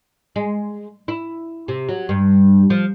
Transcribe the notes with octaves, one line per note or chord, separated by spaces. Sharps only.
G#3
E4
C3
F#3
G2
F3